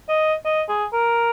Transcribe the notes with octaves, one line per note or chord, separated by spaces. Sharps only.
D#5
D#5
G#4
A#4